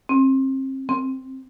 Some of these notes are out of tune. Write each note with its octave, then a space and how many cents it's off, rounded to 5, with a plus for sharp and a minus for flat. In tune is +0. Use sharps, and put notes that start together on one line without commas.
C4 +35
C4 +5